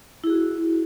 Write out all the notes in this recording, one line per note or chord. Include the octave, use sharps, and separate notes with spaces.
E4 F#4 G#4